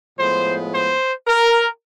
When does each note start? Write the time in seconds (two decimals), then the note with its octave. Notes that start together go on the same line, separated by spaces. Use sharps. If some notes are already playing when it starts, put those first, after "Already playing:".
0.18 A2 F3 G#3 B3 C5
0.73 C5
1.27 A#4